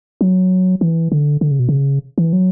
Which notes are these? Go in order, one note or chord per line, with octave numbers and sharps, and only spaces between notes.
F#3
E3
D3
D3
C#3
B2
C#3
E3
F#3